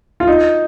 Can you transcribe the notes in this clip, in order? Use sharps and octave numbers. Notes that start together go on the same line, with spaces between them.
F4
D#4